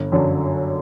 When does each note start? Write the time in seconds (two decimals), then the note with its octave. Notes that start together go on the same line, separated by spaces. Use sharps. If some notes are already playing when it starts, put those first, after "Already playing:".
Already playing: G1
0.12 F#2 D3 F#3